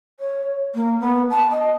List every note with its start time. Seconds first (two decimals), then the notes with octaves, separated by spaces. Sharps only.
0.20 C#5
0.75 A#3
1.00 B3
1.30 A5
1.51 D#5